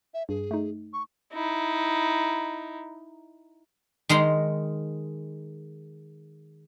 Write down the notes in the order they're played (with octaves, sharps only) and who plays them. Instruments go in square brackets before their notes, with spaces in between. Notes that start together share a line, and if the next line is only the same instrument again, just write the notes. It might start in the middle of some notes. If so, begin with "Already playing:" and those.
[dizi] E5
[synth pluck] G2 [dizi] G#4
[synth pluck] A3 D#4
[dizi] C#6
[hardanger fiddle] D#4 E4
[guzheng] D#3 G#3 A#5 C6